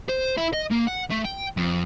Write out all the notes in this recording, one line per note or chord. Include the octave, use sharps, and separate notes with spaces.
C5
E4
D#5
A#3
F#5
A3
G5
F2